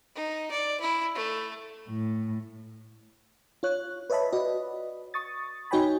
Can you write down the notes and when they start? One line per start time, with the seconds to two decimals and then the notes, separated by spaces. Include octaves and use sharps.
0.15 D#4
0.51 D5
0.81 E4
1.15 A3
1.89 A2
3.63 F4 C#5 F#6
4.10 B4 C#5 D#5 E5 A5 B5
4.32 F#4 B4 D5 D#5
5.14 C#6 D#6 A6
5.71 D#4 F#4 C#5 G5 G#5 B5